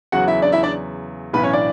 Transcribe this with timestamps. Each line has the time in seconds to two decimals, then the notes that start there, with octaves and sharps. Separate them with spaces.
0.12 E2 C#3 F#3 F#4 F#5
0.27 E4 E5
0.42 D4 D5
0.52 E4 E5
0.63 D4 D5
1.33 B1 A2 E3 B3 B4
1.43 C#4 C#5
1.53 D4 D5